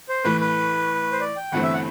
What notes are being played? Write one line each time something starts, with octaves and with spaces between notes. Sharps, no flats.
C5
A2 E3 A3 B4
B4
C5
D5
G5
G1 G2 E3 A3 C4 F#5
E5
F#5